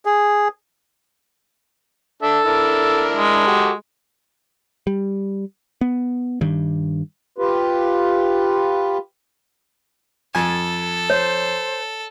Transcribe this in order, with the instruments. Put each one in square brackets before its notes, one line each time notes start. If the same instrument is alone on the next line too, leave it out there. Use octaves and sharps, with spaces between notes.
[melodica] G#4
[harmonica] D4 E5 [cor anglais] A4
[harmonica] D4 E4 A#4
[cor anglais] G#3
[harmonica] F#4 G4 A4
[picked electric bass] G3
B3
G2 D#3 G3
[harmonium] F4 G4 B4
[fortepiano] F2 G#5 [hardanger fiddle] A4
[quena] C5 [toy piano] C#5